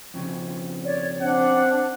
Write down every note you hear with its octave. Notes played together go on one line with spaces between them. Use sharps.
F2 C#3
C#5 D5
C4 D4 F#5